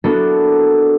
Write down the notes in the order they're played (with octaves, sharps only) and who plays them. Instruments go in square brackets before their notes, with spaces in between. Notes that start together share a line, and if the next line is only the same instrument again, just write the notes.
[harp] B3 D4 E4 F#4 A4 A#4